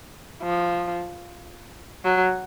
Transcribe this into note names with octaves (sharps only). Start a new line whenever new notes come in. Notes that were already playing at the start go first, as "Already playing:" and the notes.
F3
F#3